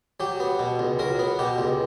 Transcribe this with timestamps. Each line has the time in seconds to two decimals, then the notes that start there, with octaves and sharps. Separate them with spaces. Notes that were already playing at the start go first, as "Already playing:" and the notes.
0.20 F#3 G4
0.40 B3
0.59 B2
0.79 C#2
0.99 F#3 A#4
1.19 B3
1.39 B2 G4
1.58 C#2